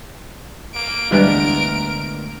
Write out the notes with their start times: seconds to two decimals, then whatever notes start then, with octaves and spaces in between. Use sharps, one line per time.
0.75 A#3 D7
1.11 D2 E3 G3 G#3 B3 D4 A#4